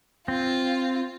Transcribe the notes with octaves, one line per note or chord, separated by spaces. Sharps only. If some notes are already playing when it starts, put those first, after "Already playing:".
C4 F4